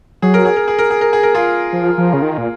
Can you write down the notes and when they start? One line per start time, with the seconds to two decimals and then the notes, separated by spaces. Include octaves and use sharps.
0.22 F#3 G#4
0.34 A#4
0.45 G#4
0.57 A#4
0.68 G#4
0.79 A#4
0.91 G#4
1.01 A#4
1.13 G#4
1.23 A#4
1.35 F4 G#4
1.73 F3
1.98 F3
2.13 C#3
2.22 D#3
2.38 A#2